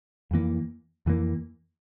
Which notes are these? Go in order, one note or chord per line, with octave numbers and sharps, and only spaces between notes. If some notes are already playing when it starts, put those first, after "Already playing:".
F2 E3 A#3
F2 E3 A#3